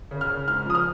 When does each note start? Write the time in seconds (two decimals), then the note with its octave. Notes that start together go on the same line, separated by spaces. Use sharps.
0.11 C#3
0.21 F6
0.30 C#3
0.48 G#2 F6
0.66 F3 D#6
0.75 F6